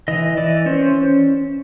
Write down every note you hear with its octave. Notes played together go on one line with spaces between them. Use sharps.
E3 D#5
E3 D5
C#4 C5